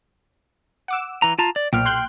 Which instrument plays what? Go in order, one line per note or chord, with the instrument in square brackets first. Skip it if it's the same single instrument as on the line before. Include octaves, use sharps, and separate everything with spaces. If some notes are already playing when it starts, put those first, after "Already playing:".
[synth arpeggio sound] F#5 D6 E6
[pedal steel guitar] E3 A#5
F4 A5 A#5
D5
[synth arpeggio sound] B1 A#2 [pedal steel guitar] G5 F6
[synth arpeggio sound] C6 F#6 G6